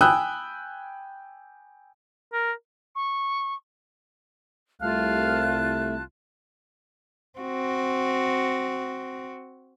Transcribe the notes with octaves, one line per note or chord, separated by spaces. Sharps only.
G5 G#5 B5 D#6 E6 F#6
A#4
C#6
C2 A3 F4 F5 A5 F#6
C4 F#4